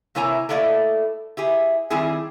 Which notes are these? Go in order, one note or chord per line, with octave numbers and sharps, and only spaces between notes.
C3 A#3 E4 C#5 G#5 A#5
A3 A#3 E4 D5 D#5
E4 G4 G#4
D#3 G3 C4 E4 G#4